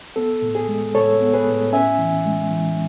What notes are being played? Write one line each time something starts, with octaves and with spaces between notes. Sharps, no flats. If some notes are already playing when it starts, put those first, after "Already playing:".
B3 A4
A2
G#4
G#3
A2 A4 C#5
B3
G#4 B4
A2
C#4 E5 G#5
E3
G#3
E3